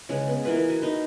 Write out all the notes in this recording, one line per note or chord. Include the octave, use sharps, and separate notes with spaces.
C#3 G#3 G#4 B4
B3
E3 A#3 F4 B4
F#4 G#5
D#4 B4